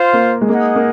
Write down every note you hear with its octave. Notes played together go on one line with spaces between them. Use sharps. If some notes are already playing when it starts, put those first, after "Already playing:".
Already playing: F4 C5 F5
A#3
G#3
A#3 D#4 G#4 D#5 F#5
A#3